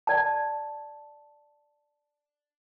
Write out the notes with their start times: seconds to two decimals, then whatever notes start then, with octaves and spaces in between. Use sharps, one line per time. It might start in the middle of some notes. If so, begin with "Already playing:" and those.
0.07 D5 A5